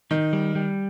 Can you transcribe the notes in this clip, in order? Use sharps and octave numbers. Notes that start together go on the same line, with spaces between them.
D#3 D#4
G3
G3